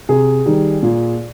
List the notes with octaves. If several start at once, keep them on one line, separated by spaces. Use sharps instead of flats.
C3 G#4
D#3 G3
A#2